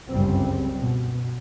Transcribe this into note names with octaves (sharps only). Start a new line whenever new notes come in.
G1 C#2 F#2 C#3 G3 C4
B2